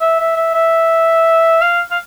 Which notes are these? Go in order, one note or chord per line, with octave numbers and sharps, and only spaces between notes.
E5
E5
E5
E5
F5
F5